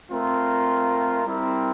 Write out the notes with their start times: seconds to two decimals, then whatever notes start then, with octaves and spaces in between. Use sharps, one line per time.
0.10 A3 C4 F4 A#4
1.25 G3 C4 E4 A#4